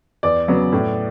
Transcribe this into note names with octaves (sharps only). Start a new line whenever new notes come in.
E2 D5
C#3 F#3 B3
A2